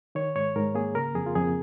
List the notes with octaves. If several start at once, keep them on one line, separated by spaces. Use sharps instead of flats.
D#3 C#5
G#2 C#5
G#2 A#4
A#3 G#4
C#3 A#4
F2 G#4
F4
F2 G#4